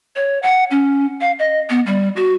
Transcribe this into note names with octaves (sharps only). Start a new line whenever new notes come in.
C#5
F#5
C#4
F5
D#5
B3
G3
F#4